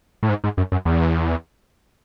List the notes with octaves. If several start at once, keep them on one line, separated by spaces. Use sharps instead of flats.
A2
G#2
G#2
F#2
F#2
E2